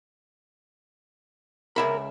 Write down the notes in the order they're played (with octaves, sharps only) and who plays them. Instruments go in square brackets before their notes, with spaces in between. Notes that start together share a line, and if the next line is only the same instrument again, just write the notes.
[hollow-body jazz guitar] C#2 E5 B5 [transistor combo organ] A#4